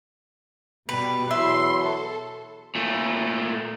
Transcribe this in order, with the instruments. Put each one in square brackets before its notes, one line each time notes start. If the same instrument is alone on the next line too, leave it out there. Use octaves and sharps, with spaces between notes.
[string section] B2 G3 [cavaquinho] B4
[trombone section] E2 F#3 E4 [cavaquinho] E5 [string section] C6
[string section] A4
[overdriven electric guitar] A#2 A3